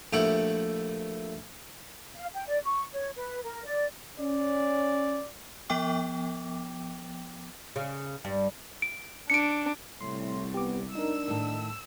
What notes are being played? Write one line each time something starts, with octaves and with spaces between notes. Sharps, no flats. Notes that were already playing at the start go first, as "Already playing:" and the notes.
A#1 A3 E4 G4 F#5
F5
G5
D5
C#6
C#5
B4
A#4
D5
C#4 D5
F3 B3 G5 D6
C#3
G2
D7
D4 C#7 D7
C2 A2 C6
B3 G4 D6
D4 D#4 A#4 E6
A2 D#3